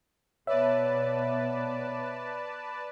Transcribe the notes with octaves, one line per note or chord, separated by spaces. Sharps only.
B2 B3 B4 C#5 D5 E5 A5